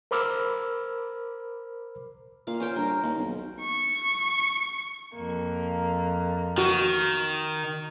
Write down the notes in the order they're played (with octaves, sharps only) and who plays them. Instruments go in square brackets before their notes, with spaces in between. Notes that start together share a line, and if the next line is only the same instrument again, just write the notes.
[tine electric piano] A#4 C5 B5 D6 E6 F6
[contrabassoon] A#2 [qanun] F5
[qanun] C#4 C5 G5
[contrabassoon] G2 [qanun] A#4
[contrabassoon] D#2
B1
[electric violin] C#6
[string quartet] F2 A#3
[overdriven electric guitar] D#3 [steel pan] F#4